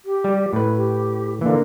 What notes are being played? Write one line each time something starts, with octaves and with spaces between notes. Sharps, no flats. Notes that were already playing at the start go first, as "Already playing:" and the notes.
G4
G3
A2 B4
G4
D3 E3 A#3